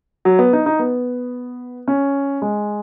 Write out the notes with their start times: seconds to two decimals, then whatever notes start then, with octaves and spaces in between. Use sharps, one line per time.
0.25 F#3
0.39 B3
0.53 D#4
0.66 D#4
0.79 B3
1.88 C#4
2.42 G#3